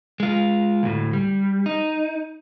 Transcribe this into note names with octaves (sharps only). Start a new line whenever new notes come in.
G#3 F4
D2 A2
G3
D#4